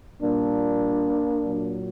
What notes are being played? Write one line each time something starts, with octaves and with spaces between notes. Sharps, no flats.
A#2 G3 A#3 D4
A#2 F#3